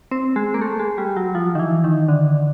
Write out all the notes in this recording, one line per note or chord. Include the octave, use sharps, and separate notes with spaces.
C4
G#3
A#3
A3
G#3
G3
F#3
F3
D#3
E3
D#3
D3